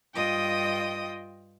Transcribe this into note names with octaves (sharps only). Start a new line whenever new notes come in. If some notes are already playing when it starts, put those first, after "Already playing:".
G2 F4 D#5 G5 D#6